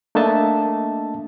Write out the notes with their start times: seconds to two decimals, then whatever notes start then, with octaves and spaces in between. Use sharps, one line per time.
0.15 A3 A#3 D4 D#5 E5 A5